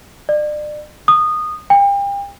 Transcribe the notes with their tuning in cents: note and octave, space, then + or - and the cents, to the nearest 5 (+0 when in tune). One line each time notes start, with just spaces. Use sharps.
D5 +35
D#6 -20
G5 +35